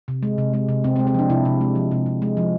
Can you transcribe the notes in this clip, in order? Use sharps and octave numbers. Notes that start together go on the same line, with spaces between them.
C3
G#3
C3
G#3
C3
C3 C4
C4
G#3
C4
F3 D4
C3 E4
C3
G#3
F3
C3
C3
G#3
F3